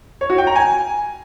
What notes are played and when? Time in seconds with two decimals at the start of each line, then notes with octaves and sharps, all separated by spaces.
0.21 C#5
0.30 F#4
0.38 G5
0.47 A#5
0.56 G#5